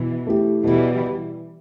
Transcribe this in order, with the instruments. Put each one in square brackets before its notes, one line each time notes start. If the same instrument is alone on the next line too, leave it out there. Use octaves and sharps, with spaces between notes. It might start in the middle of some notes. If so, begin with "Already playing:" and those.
Already playing: [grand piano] B2 [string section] E3
[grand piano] A3 E4 G4
[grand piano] B2 [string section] E3 G3